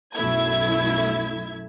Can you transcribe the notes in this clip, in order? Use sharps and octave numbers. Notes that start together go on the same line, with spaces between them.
B1 F#2 A3 E4 E5 G#6